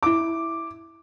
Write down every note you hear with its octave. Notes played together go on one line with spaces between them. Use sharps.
E4 D6